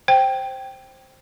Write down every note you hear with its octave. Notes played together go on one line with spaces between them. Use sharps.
C5 G5